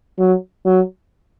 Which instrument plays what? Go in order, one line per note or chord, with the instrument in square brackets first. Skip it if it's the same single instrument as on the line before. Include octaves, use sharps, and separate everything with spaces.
[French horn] F#3
F#3